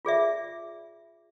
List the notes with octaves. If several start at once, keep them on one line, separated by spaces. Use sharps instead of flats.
F4 G#4 D5 E5